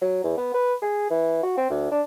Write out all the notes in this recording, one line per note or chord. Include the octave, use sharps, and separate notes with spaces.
F#3
E2
B3
B4
G#4
E3
F#4
C4
D2
D4